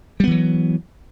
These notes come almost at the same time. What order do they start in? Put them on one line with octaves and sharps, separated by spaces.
G3 B3 E3 F#3